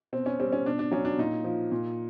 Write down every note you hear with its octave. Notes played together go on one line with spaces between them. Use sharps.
B2 C4
C#4
G3 C4
C#4
B2 D4
D4
F#3 C#4
D4
A#2 D#4
F3
A#2